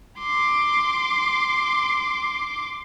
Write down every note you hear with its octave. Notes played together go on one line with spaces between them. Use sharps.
C6 D6